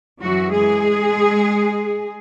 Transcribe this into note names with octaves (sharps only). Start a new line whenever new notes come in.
F#2 E3 F#3 F#4
G#3 G#4